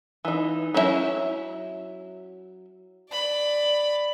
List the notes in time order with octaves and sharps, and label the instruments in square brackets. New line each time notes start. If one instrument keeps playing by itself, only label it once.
[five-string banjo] E3 D#4
F#3 C#4 D4 E4 E5
[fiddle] D5 B5